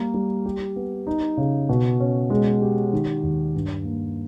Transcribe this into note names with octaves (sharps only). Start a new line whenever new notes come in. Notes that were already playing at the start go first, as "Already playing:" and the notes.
Already playing: G3 A#3
G3
G4
B3
D#4
C#3
B2
C#4
G#3
G4
D#3
D#2
G2
A#3